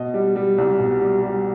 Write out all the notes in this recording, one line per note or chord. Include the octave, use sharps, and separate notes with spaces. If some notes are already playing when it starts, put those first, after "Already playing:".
Already playing: B2 D#5
G3
G3
C2
B2
G3
G3